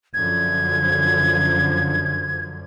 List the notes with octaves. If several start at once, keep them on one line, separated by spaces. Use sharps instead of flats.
F#2 D3 F3 G#6